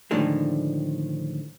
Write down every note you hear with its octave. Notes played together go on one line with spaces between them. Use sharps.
A2 D3 D#3 F3 G#3